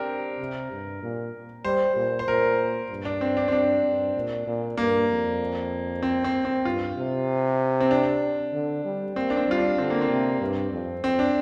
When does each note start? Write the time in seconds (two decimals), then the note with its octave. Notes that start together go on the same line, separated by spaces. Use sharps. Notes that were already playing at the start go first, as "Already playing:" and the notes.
Already playing: C4 D4 G4 A#4
0.39 C3
0.71 G2
1.02 A#2
1.64 G3 C5
1.96 A#2
2.19 C5
2.27 A#2 A#4
2.90 G2
3.05 D4
3.21 C4
3.37 D4
3.48 C4
3.52 G2 D4
3.84 G2
4.15 A#2
4.46 A#2
4.77 G2 A#3
5.09 F2
6.03 C4
6.24 C4
6.45 C4
6.65 G2 F4
6.97 C3
7.80 C4
7.91 D4
8.53 D3
8.84 G3
9.16 A#3 C4
9.30 D4
9.37 C4
9.47 G3 F4
9.58 D4
9.78 D3 C4
9.90 A#3
10.01 C4
10.09 C3
10.41 G2
10.72 F2
11.04 F2 C4
11.19 D4